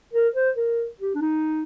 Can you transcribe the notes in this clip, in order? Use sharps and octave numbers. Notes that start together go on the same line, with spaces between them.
A#4
C5
A#4
G4
D4
D#4